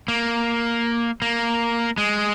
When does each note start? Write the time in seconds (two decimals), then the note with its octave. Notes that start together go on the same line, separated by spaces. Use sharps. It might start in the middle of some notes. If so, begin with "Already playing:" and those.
0.08 A#3
1.22 A#3
1.98 G#3